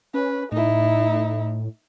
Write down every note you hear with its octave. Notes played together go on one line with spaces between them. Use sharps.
C#4 B4
A2 D#4 E4